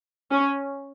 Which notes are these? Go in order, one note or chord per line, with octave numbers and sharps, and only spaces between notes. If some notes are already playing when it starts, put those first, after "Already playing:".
C#4